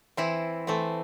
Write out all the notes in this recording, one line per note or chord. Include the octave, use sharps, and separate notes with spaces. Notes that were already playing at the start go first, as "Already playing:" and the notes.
E3 C4 E4
E3 A3 C4